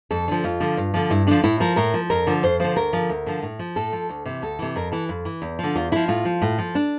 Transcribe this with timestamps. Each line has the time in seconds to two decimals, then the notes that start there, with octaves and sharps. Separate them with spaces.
0.11 F2 A4
0.28 D3 F3
0.44 F2 F4
0.60 D3 F3
0.77 G2
0.94 D3 F3
1.10 G2 E4
1.27 D3 F3 D4
1.44 A2 E4
1.60 F3 A#4
1.76 A2 A#4
1.94 F3
2.10 F2 A#4
2.27 D3 F3
2.43 F2 C5
2.60 D3 F3 C5
2.76 D2 A#4
2.93 D3 F3
3.10 D2
3.26 D3 F3
3.42 A2
3.59 F3
3.76 A2 A4
3.92 F3
4.09 D2
4.26 C3 E3
4.42 D2 A4
4.59 C3 E3
4.76 F2 A#4
4.92 E3 A4
5.09 F2
5.25 E3
5.42 E2
5.59 D3 F3
5.75 E2 F4
5.92 D3 F3 E4
6.08 A2 F4
6.25 F3
6.42 A2
6.58 F3
6.75 D4